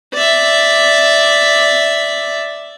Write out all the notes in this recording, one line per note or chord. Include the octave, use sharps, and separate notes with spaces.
D5 E5